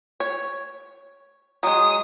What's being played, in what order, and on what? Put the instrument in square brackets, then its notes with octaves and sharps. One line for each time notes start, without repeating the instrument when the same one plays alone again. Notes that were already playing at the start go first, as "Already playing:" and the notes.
[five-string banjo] C#5
[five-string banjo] F#3 G#3 [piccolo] D#6